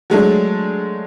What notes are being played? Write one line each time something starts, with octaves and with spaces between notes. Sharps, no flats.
F#3 G#3 A3 D4